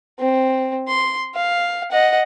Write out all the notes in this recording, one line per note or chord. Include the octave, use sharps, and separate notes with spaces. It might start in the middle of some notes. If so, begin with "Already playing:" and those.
C4
C6
F5
D#5 F#5